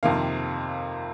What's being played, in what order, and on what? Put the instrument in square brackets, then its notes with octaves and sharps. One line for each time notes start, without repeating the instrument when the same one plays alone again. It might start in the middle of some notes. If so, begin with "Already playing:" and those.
[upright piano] F2 C3 D#3 A#3 F5